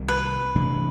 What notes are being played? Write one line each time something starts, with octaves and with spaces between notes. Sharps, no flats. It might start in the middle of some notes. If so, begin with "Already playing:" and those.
Already playing: C2 C3 D#3 G3
B4
C3 E3 A3 D4